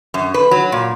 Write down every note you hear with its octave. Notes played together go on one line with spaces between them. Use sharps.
F#2
B4
F#3
A#2